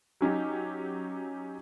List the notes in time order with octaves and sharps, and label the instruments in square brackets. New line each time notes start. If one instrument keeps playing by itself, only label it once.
[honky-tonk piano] F#3 C#4 D#4 G4